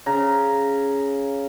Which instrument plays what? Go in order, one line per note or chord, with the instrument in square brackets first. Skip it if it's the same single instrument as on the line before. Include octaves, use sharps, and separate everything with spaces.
[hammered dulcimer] C#3 A#5